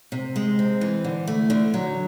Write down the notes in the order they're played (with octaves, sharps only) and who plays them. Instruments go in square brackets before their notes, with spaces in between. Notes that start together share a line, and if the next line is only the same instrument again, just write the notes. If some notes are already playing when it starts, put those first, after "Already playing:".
[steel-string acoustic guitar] C3
G#3
C4
E3
D3
A3
D3
F#3